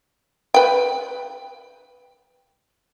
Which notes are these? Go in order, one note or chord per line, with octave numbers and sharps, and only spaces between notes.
B4 G5